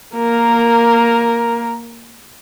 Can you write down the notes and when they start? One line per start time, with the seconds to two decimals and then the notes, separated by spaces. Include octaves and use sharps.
0.15 A#3 A#4